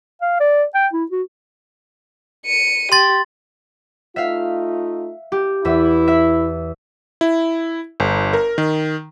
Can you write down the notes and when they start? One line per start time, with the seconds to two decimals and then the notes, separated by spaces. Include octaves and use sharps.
0.22 F5
0.40 D5
0.74 G5
0.93 E4
1.12 F#4
2.46 C#7 D#7
2.92 G4 C6 A6
4.16 A3 D#4 F4 E5 F5
5.32 G4
5.65 E2 E4 E5
6.08 E5
7.21 E4
8.00 G1
8.33 A#4
8.58 D#3